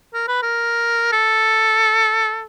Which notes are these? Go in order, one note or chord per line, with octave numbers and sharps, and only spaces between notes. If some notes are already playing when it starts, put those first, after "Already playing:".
A#4
B4
A#4
A4